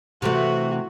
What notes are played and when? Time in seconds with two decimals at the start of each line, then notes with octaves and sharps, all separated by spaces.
0.22 C3 E3 A3 F#4